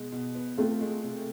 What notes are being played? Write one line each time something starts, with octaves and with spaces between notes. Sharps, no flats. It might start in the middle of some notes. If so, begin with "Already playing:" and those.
Already playing: B2 G#3 B3
B2
B3
A3 C4 F4
G#3
C3